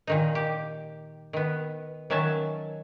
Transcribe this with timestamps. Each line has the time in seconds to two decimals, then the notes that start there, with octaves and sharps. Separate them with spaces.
0.07 A#2 D#3 D#4
0.35 G4
1.33 D#3 B3
2.10 D#3 F#3 C#4 E5 A5